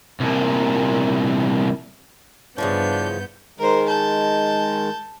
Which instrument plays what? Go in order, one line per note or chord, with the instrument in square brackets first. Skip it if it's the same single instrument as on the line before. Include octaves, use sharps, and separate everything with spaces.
[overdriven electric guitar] C2 A#2
[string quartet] G2 B3 G6 [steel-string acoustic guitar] C#3 E3 F3 [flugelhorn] D4
[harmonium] D#3 G#3 [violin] A#4 C5
[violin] A5 G6